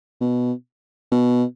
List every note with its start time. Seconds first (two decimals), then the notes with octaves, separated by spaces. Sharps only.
0.20 B2
1.12 B2